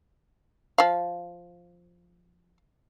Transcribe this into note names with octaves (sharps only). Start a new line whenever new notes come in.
F3 F5